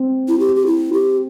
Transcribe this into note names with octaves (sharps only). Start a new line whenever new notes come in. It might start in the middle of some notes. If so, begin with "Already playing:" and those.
Already playing: C4
E4
G4
G4
E4
G4